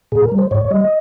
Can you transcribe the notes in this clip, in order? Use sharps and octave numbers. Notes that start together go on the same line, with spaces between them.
A#2 G#4
A#4
G3
C5
G#2 C#5
C#5
G3 D#5
D#5